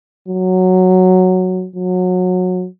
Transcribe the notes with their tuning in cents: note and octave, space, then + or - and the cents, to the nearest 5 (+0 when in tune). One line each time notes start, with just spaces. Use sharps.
F#3 +0
F#3 -20